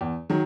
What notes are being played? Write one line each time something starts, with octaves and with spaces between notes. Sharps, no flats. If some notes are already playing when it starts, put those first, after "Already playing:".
E2
D#3 F#3